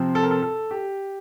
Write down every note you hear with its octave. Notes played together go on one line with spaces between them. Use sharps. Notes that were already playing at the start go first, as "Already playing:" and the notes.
Already playing: C3 F3 C4
A4
A#4
A4
A4
G4